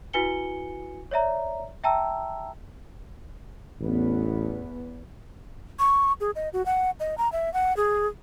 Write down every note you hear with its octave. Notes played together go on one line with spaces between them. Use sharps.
E4 F#4 B4 G#5 C#7 G7
C#5 D5 E5 A#5
E5 G5 A5 A#5 E6
A1 E2 B3
C#6
G#4
D#5
F#4
F#5
D#5
A#5
E5
F#5
G#4